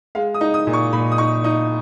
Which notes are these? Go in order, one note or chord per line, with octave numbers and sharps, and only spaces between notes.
G#3 F5
D#6
D#4
D#6
A#2
C#6
A#2 B5
D#6
D#4 C#6
D#4 D#6